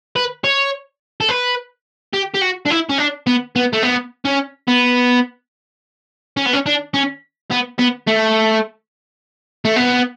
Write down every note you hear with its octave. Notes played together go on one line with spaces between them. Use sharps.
B4
C#5
A4
B4
G4
G4
F#4
D4
E4
C#4
D4
B3
B3
A3
B3
C#4
B3
C#4
B3
C#4
D4
C#4
B3
B3
A3
A3
B3